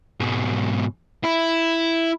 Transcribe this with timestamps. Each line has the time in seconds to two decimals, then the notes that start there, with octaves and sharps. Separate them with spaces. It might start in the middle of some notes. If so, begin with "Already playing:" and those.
0.20 G#2 B2
1.24 E4